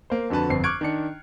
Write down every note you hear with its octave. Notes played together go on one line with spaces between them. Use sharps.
A#3 C5
F2 D3 F#4 B4 A5
G1 F2 C4 C7
C#6 D6 F6 F#6 G#6 D7
D#3 D4 C#7